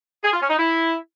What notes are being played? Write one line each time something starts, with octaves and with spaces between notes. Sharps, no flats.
G#4
F4
C#4
D#4
E4